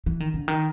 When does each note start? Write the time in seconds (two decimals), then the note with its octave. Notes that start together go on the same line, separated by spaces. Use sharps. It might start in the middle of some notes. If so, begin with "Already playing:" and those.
0.06 E3
0.20 D#3
0.34 D3
0.48 D#3